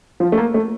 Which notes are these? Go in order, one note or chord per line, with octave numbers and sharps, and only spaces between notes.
F3
A3
A#3
A3